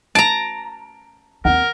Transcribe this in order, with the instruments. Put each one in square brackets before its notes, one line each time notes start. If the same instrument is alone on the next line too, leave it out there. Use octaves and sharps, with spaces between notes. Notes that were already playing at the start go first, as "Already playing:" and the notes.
[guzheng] A5 A#5 [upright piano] D7
[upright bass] D#2 C4 [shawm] A#4 [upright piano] F#5